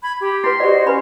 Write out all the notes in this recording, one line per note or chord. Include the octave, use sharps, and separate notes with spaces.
B5 G#6
G4
E4 B4 C6
F#4 G4 C5 D5 D#5
C#4 B4 B5